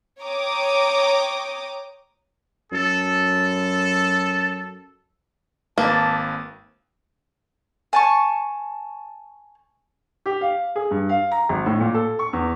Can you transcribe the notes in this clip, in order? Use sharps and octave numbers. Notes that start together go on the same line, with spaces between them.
C#5 G5 A#5 D6 D#6
F#2 A4
G#1 A#3 B4 A5
G#5 A5 C#6
G4
F5
G#4
G2
F5
A#5
G#1
A2
A#2
A4
C#6
E2